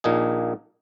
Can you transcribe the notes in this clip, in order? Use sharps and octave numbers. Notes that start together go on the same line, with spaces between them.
A#1 A#2 A#3 D#4 G#4